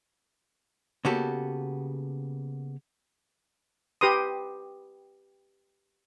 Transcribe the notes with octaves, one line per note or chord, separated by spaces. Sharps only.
C#3 A#3 B3 F#4 G4 A4
G4 B4 C6 D#6